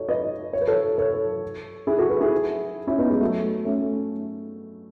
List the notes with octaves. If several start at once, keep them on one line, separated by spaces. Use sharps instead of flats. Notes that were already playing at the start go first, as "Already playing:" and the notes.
Already playing: D#4 F#4 A4 C#5
B4 D#5
C#5
B4
A4 C#5
A4 C#5
E4 G#4
F#4 A4
G#4 B4
E4 G#4
C#4 E4
B3 D#4
G#3
F#3 A3
A3 C#4